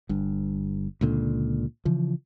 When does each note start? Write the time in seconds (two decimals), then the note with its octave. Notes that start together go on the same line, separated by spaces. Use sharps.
0.09 G1 G2
1.01 C#2 A#2 D3
1.85 C#3 E3 F3